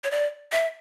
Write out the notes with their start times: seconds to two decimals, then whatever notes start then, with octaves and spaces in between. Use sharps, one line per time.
0.04 C#5
0.11 D5
0.52 E5